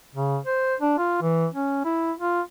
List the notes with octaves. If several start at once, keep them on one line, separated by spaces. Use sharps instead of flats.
C#3
C5
D4
F4
E3
C#4
E4
F4